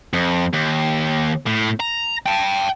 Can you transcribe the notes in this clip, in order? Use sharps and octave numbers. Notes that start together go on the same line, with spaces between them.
F2
D#2
A2
A#5
G5 A5